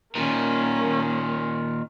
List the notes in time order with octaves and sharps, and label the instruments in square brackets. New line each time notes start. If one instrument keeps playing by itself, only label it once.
[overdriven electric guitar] A#2 D#3 [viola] A#3 C#4